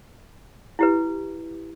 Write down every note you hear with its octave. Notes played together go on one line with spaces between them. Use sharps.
E4 G4 B4